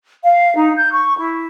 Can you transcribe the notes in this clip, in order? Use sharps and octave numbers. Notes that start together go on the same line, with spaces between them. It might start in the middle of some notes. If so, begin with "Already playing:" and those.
F5
D#4
G6
C#6
E4